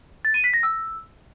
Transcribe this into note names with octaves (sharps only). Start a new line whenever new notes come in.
A6
D#7
B6
A#6
E6